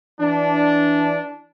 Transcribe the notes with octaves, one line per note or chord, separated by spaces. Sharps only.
E3 D4